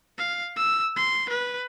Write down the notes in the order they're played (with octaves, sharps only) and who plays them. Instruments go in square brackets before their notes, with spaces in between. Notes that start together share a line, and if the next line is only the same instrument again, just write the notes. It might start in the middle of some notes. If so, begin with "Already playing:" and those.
[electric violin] F5
E6
C6
B4